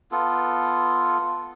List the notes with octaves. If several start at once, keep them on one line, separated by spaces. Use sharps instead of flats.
B3 F4 A4